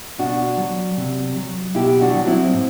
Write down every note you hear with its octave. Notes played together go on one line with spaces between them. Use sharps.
B2 D4 F#4
F#3
C3
F#3
B2 E4 G4
D4 F#4
F#3
C4 E4
A2